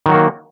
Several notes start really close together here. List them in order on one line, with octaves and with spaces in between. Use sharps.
D#3 F#3 F#4 A#3